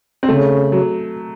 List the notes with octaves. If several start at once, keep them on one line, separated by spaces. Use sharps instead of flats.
C4
C#3 A3
F#3